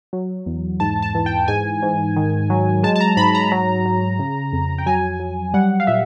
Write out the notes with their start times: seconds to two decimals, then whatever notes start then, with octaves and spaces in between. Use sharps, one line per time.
0.13 F#3
0.46 E2
0.80 G#2 A5
1.02 A5
1.15 E3
1.26 G5
1.48 G#2 G#5
1.82 G#2
2.16 D#3
2.50 F#3
2.83 G#3 A5
2.96 A5
3.01 A#5
3.17 G#2 B5
3.35 A#5
3.52 F#3
3.85 F#3
4.19 C#3
4.53 F2
4.78 G5
4.86 F#3 G#5
5.20 F#3
5.54 G3 F#5
5.80 F5
5.87 A#2 E5